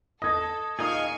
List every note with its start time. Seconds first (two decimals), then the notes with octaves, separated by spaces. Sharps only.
0.22 A4 D#5 D#6 G#6 A#6
0.79 A#2 D#4 G#4 D#5 F5 G#5 C#6